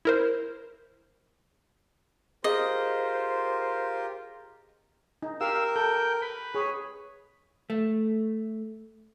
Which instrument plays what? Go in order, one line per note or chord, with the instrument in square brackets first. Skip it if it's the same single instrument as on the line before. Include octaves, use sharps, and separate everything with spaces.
[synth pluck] E4 A#4 C5
[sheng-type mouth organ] F4 G4 A#4 [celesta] G#4 [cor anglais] C5 [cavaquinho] D#5
[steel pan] D#4
[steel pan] G4 F5 [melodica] A#4 [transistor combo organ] E6
[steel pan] A4 [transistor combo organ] G5
[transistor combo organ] B4
[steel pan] G#4 [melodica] C#5
[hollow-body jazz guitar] A3